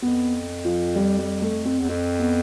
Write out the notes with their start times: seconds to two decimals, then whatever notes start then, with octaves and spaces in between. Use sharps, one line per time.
0.02 F2 B3
0.65 F3
0.96 G3
1.19 G3
1.42 A3
1.65 C4
1.80 E2
1.89 F2 C4
2.19 B3